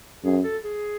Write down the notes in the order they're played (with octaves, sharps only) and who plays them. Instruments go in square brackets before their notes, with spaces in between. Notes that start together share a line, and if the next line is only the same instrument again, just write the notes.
[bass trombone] F#2 [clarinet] G#4
[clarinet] A4
G#4